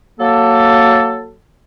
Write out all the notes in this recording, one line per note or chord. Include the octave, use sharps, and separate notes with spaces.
F#3 A#3 A4